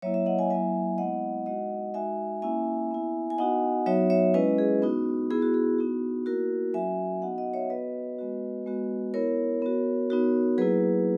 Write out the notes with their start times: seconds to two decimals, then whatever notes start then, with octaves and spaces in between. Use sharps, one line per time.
0.02 F#3 A#3 E4 C#5 E5
0.14 C#5 E5
0.26 D#5 F#5
0.39 E5 G#5
0.50 F#3 A#3 E4 E5 G#5
0.98 G#3 B3 E4 D#5 F#5
1.46 G#3 D#4 F#4 D#5 F#5
1.94 G#3 D#4 F#4 E5 G#5
2.42 A#3 C#4 E4 E5 G#5
2.91 B3 E4
3.30 G#5
3.38 B3 D#4 F#4 D#5 F#5
3.86 F#3 B3 D#4 F#4 C#5 E5
4.10 C#5 E5
4.34 G#3 C#4 E4 B4 D#5
4.58 G#4
4.82 B3 D#4 F#4
5.30 B3 E4 G#4
5.42 F#4
5.54 G#4
5.78 B3 D#4 F#4
6.26 A#3 E4 F#4 A#4
6.74 F#3 C#4 F#4 E5 G#5
7.22 B3 D#4 F#4 D#5 F#5
7.38 D#5 F#5
7.54 C#5 E5
7.70 B3 F#4 B4 D#5
8.18 G#3 B3 F#4
8.66 G#3 B3 F#4
9.14 B3 E4 A#4 C#5
9.62 B3 F#4
10.10 B3 D#4 F#4
10.58 F#3 A#3 E4 G#4 B4